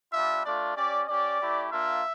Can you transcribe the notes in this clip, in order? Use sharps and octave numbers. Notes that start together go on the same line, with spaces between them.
G3 D4 F4 E5
A3 D4 F4 D5
C#4 G4 D5
C#4 G4 D5
A3 E4 G4
A#3 D4 F4 E5